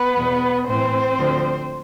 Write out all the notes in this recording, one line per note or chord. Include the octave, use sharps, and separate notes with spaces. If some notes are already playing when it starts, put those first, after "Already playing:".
Already playing: B3 B4
E2 B2
A2 E3 C4 C5
D2 D3 F3